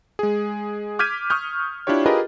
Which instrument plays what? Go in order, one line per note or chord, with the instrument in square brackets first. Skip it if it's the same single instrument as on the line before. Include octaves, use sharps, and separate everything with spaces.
[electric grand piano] G#3 G#4
D6 F6 G6 G#6 B6 D#7
C#6 D#6 F6 G6
D4 E4 F4 G4 C#5
F4 G4 G#4 A#4 B4 D#5